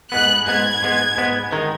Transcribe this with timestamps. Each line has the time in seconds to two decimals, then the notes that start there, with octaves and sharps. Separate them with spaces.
0.12 G#2 G#3 B3 F#6
0.47 G#2 G#3 B3 G#6
0.82 G#2 G#3 B3
1.17 G#2 G#3 B3
1.53 D#3 G#3 D#4